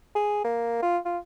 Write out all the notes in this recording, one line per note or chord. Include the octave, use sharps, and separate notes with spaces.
G#4
A#3
F4
F4